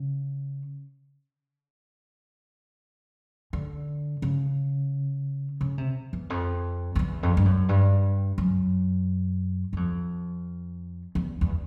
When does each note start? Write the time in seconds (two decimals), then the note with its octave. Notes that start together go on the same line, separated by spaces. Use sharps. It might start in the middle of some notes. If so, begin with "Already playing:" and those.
Already playing: C#3
3.53 D3
4.22 C#3
5.61 C#3
5.78 C3
6.13 E2
6.30 F2
6.95 F2
6.99 E2
7.23 F2
7.37 G2
7.45 F#2
7.69 G2
8.38 F#2
9.73 F#2
9.77 F2
11.15 E2
11.41 E2